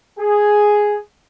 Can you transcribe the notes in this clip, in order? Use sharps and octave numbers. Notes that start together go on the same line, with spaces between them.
G#4